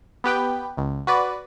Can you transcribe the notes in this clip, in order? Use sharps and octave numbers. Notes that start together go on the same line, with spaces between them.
B3 G4 B4 G5
C#2
F#4 B4 D5